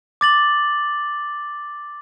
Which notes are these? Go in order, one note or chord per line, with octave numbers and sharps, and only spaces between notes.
D6 A6 F#7